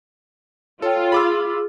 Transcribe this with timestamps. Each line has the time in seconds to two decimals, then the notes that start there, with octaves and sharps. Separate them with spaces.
0.82 F4 A4 C#5 G5
1.12 G#4 B5 D6 E6